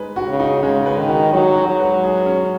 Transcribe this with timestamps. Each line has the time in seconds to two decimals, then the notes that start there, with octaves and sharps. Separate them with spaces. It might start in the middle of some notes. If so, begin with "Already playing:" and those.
Already playing: G#3 D#4 B4
0.16 F#4
0.28 C#3
0.39 D#4
0.63 C#3 G#3
0.86 B4
0.97 D#3
1.09 F#4
1.33 F#3 D#4
1.56 G#3
1.68 F#3
1.80 B4
2.03 G#4
2.26 C#4